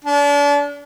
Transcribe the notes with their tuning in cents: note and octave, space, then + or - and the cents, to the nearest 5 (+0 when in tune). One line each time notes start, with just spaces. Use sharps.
D4 -35